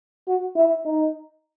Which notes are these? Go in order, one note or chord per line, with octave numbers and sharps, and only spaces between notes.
F#4
E4
D#4